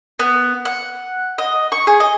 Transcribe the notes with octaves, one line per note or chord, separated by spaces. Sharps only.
B3
F#5
D#5
C#6
G#4
D#5